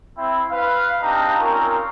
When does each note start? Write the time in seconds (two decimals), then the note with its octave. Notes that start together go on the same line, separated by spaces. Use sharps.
0.17 C4 E4
0.51 B4 F5
1.01 C4 D4 D#4 G4 A#5
1.38 C4 C#4 F4 A#4